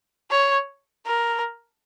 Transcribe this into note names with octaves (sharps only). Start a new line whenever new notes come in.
C#5
A#4